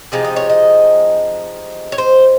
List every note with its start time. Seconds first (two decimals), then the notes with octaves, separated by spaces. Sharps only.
0.12 C3 F3 G#3 D#4
0.25 D#5
0.36 C#5
0.50 D#5
1.92 C#5
1.98 C5